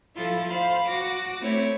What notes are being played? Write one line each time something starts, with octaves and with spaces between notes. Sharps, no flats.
F3 E4 F4 A4
C5 F5 B5
F#4 D6 A#6
A3 C4 E4 C#5